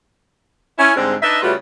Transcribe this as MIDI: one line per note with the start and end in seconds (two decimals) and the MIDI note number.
0.78 0.91 61
0.78 0.91 64
0.96 1.15 44
0.96 1.15 50
0.96 1.15 55
0.96 1.15 56
0.96 1.15 60
1.23 1.38 62
1.23 1.38 63
1.23 1.38 71
1.23 1.38 76
1.42 1.53 49
1.42 1.53 55
1.42 1.53 57
1.42 1.53 65
1.42 1.53 66
1.42 1.53 71